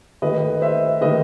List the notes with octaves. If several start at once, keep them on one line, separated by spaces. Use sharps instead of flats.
D#3 A3 B4 D#5
C5 E5
D#3 A3 B4 D#5